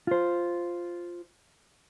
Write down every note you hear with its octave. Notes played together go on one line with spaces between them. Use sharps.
F4 C5